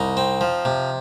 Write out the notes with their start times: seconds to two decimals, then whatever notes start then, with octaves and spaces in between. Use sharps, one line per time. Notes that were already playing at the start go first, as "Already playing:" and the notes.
Already playing: C2 D#4
0.17 C4
0.41 F3
0.65 C3